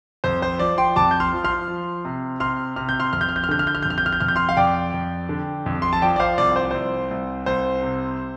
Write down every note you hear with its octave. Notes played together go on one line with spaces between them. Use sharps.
F2 C5
C5
F3 D5
G5 C6
F2 A5 D6
G6
C6 F6
F3
C6 F6
F3
C3
C3 C6 F6
C3 F6
G6
C6 F6
F2 F6
G6
F6
G6
F6
D3 G6
F6
G6
F6
F2 G6
F6
G6
F6
G6
F2 F6
G6
C6 F6
F5
F2 D5 G5
F2
D3
F2
C6
A5
F3 D5 G5
D5
C5 F5
C2 D5
C5
C2 C5
C2
C2 C5
C3